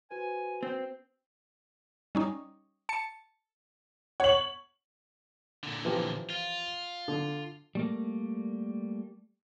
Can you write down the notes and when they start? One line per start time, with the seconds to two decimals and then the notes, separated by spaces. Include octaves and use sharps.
0.11 F#4 B4 C5 G#5
0.63 C4 G5
2.15 G3 C#4 D#4
2.89 A5 C#7
4.20 C#5 F#5 C#6 F#7
5.63 A#2 D3
5.85 E3 F3 G4
6.30 F4
7.08 D3
7.75 G3 A3 A#3